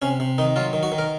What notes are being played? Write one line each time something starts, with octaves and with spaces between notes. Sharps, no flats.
C3 C#4
C3
D#3 D#4
F#3 F4
D#3
F#4
D#3
A#4